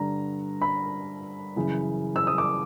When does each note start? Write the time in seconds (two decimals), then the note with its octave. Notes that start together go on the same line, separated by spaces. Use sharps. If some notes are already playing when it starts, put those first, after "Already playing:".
Already playing: G2 D3 A#5
0.62 B5
1.56 F#2 C#3 E3
2.16 E6
2.27 D#6
2.38 D6